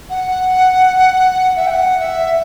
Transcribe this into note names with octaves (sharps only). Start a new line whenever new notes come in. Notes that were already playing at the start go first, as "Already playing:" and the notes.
F#5
E5
G5
F#5
E5